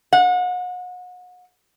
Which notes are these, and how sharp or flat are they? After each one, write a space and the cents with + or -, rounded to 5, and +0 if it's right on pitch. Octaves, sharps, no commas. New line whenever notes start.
F#5 -35